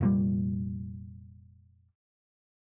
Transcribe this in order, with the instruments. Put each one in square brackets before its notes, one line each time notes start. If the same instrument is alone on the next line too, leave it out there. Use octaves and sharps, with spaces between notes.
[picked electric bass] F1 A#2 G3